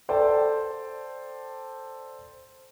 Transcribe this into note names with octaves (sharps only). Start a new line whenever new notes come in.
A4 C5 D5 G5 A5